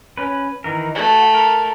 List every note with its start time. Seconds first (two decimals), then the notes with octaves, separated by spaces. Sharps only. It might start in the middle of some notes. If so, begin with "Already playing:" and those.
0.17 C#4 B4
0.64 D#3 E3 A#4
0.95 A3 F#4
1.34 A#4